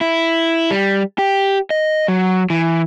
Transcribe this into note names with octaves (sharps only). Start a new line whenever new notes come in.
E4
G3
G4
D#5
F#3
E3